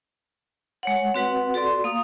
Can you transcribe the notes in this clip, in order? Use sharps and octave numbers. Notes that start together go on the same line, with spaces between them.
G#3 C#5 F#5
C4 F#4 B4 F#5
F#4 A4 D5 C6
A#3 F5 D#6